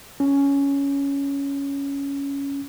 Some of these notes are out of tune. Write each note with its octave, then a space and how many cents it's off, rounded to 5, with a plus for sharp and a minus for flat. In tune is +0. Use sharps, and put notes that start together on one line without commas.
C#4 +10